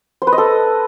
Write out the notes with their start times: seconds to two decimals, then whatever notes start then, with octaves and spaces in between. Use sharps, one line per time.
0.22 C5
0.27 B4
0.33 D#5
0.38 A4